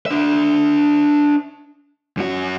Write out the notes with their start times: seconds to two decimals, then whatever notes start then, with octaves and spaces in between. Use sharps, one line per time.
0.06 D4 E5
2.17 F#2 F#4